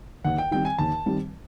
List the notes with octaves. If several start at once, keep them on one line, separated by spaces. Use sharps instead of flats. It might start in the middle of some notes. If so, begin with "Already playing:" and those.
D#2 F#5
G5
D#3 G3 C4 G5
G#5
D#2 A5
D#3 G3 C4